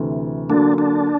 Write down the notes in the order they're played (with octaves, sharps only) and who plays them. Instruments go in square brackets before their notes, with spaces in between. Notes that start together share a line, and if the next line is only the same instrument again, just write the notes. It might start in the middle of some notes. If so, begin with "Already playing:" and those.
Already playing: [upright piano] D2 C3 E3
[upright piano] D3 F#3 A#3 [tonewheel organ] D4
[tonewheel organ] D4